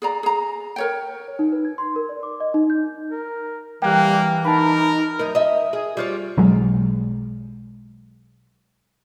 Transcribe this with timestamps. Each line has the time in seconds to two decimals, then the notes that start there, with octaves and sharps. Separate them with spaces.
0.02 G#4 D5 A#5
0.23 G#4 A#5
0.76 A#4 C#5 G5
1.28 C#5
1.39 D#4
1.52 B4
1.65 G#6
1.78 C6
1.96 A#4
2.09 D5
2.23 D6
2.40 D#5
2.54 D#4
2.70 G6
3.10 A#4
3.82 E3 G3 A#3 G5 F#6
4.45 D#4 A#4 A5 B5
5.19 F#2 D#4 A#4
5.35 D#5 E5
5.73 G#4
5.97 G3 F4 C#5
6.38 B1 F#3 G#3